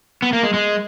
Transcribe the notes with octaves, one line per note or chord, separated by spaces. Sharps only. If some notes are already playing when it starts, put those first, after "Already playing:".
B3
A#3
G#3
G#3